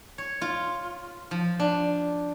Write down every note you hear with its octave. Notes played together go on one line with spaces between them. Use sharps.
C#5
F4
F3
D4